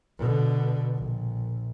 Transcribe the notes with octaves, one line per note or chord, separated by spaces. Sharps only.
B2 D3
A#1